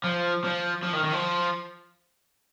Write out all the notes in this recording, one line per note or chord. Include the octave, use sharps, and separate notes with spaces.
F3
F3
F3
D#3
D#3
F3